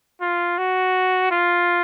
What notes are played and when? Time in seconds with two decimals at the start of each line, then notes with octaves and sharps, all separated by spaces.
0.21 F4
0.58 F#4
1.31 F4